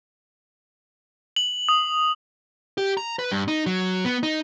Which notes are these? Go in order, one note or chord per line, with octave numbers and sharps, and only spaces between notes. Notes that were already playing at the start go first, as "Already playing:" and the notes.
F#7
D#6
G4
A#5
B4
G2
D#4
F#3
B3
D#4